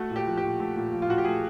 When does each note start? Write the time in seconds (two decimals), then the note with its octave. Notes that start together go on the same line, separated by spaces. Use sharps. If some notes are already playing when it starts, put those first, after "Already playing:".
Already playing: A3 F#4
0.10 A#2
0.16 G4
0.27 F3
0.37 G4
0.44 A#2
0.60 A3
0.76 A#2
0.92 F3
1.02 F4
1.08 A#2 F#4
1.18 G4
1.25 A3 G#4